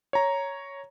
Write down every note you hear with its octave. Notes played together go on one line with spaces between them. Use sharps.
C#5 A#5